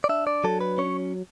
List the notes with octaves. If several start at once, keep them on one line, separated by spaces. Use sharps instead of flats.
D5
D4 E5
D5
F#3 A4
B4
C#4 C#5